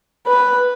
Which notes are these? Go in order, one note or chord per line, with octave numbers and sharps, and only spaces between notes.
B4